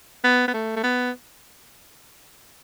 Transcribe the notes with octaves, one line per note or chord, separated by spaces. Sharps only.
B3
B3
A3
A3
B3